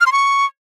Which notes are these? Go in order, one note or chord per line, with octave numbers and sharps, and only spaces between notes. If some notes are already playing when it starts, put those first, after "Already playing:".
F6
C6
C#6